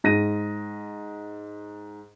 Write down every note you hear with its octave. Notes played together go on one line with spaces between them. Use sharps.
G#2 A#6 D#7